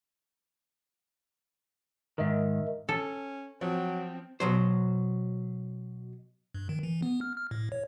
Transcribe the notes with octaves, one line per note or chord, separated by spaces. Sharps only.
G#2 D#3 A#4 D#5 E5
C#4 A4
F3 F#3 C4
B2 F#3 C5
G2
D#3
E3
B3
F6
F6
A2
C#5